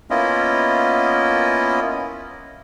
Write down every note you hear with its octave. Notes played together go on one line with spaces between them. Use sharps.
A#3 B3 C#4 E4 F4 D#5